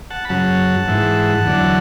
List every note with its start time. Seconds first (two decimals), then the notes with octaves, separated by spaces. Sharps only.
0.10 F#5 A5
0.25 B5
0.29 F#2 C#3 F#3 F#5 A5
0.88 G#2 E3
1.45 E2 D3 F#3